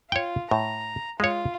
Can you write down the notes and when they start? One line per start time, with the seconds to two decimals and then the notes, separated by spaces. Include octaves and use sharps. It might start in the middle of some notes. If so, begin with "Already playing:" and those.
0.12 F4 C#5 G5
0.51 A2 A#5
1.20 G#3 F4 C#5